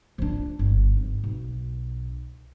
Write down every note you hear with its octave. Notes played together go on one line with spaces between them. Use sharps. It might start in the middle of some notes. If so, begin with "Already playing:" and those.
F3 D4
G1
G#1
B1